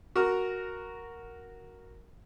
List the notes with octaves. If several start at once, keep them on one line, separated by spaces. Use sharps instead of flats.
F#4 A#4